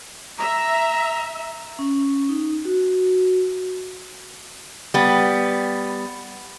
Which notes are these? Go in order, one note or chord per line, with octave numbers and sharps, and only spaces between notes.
E5 A#5
C#4
D#4
F#4
G3 B3